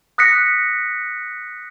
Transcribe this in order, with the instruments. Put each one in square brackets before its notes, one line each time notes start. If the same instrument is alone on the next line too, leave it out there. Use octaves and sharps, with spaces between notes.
[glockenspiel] D#6 F#6 A#6 B6 C#7